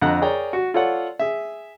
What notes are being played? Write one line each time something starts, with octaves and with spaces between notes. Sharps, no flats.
F2 D3 D#5 F#5 A#5 F#6
G#4 A#4 C#5 D5 G5 A#5
F#4
F4 A4 C#5 D5 F#5
G#4 E5